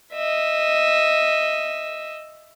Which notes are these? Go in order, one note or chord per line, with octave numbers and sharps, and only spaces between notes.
D#5 E5